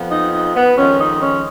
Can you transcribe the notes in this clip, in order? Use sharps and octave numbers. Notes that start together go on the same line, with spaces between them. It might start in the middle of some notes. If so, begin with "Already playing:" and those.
Already playing: F2 F3 B3
D#4
D#4
B3
F2 D#3 G#3 C#4
D#4
C#4